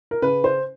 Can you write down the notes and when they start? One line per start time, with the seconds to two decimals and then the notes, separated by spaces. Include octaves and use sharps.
0.11 A#4
0.22 C#3 B4
0.44 C5